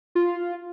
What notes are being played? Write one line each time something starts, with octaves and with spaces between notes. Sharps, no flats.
F4